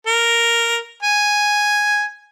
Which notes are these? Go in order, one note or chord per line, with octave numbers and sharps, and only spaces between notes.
A#4
G#5